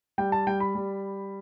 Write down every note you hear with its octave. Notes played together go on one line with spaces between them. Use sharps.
G3 G5
A5
G3 G5
B5
G3